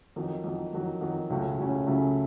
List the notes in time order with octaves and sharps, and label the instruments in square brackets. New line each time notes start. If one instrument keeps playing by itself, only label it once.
[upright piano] F2 D#3 F#3
F2 D#3 F#3
F2 D#3 F#3
F2 D#3 F#3
C#2 C#3 F#3 A3 C#4
C#2 C#3 F#3 A3 C#4
C#2 C#3 F#3 A3 C#4